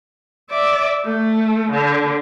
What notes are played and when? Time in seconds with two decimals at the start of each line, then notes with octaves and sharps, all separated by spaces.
0.50 D5 E5
1.05 A3
1.71 D3